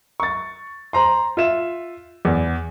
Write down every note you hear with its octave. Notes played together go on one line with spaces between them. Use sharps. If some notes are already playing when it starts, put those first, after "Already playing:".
C#6 A6
C5 A#5 C6
F4 E5 E7
E2